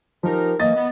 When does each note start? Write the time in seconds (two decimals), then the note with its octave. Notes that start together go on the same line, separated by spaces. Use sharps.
0.23 F3 D#4 G4 A#4
0.60 E3 F#3 A#3 D#5 A6
0.75 B3